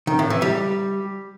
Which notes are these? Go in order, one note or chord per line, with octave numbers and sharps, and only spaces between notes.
D#3
A2
E3
G3